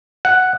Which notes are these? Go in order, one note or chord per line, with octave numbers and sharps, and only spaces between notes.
F#5